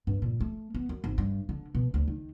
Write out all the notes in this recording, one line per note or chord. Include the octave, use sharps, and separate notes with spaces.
G2
A#2
A3
B3
F#2
G#1
G2
D3
B2
D2
D#3